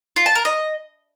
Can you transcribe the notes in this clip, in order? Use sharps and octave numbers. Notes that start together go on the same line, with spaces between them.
F4
A5
A#4
D#5